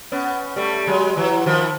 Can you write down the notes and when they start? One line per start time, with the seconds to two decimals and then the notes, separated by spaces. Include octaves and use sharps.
0.12 B3 C#4
0.56 G3 A3
0.87 F#3 G#3
1.17 E3 F#3
1.46 D#3 F3